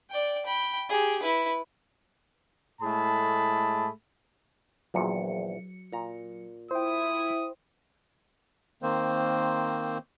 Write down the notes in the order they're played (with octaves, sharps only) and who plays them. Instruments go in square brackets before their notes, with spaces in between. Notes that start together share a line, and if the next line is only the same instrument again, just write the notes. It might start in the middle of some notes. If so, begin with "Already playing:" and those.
[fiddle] D5 G5
G5 B5
G4 G#4
E4 B4
[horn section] A2 G#3 A3 G#4 A5 B5
[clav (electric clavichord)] A#1 E2 A#2 [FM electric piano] F#3 C#7
[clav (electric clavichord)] A#2 A#5
[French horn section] E4 [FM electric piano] C5 G5 [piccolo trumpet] D#6
[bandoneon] D#3 A#3 C4 C5